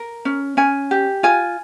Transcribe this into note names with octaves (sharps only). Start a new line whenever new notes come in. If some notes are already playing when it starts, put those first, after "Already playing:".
Already playing: A#4
C#4
C#4 G#5
G4
F4 G#5